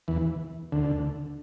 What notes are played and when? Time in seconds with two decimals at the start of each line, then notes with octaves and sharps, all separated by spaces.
0.08 E2 E3
0.72 D2 D3